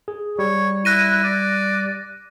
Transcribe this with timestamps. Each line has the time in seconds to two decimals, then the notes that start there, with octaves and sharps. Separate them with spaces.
0.08 G#4
0.39 G3 C#5
0.85 E4 F#6 A#6 D#7
1.23 D5